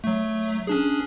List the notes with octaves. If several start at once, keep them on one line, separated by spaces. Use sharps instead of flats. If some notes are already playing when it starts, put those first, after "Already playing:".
F#3 A3
C#4 D4 G#4